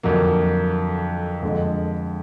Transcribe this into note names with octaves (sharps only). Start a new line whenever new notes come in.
F2 D3 F#3 A#3
F2 D3 G#3